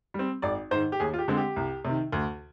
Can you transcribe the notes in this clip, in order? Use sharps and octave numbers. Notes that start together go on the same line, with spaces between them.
G3 C4
G#1 D5
G#2 D#3 C5
G4
D#2 G#4
F4
G4
D3 G#3 C4
G4
C2
C3 D#3
D2